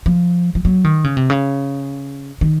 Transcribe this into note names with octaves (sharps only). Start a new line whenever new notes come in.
F3
F3
F#3
D#3
C#3
C3
C#3
D#3